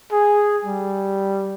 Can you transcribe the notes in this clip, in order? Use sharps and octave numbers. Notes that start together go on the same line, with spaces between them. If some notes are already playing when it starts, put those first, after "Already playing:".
G#4
G3